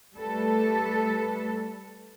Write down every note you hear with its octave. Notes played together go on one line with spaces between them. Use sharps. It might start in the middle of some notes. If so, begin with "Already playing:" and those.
G3 A3 A4 B4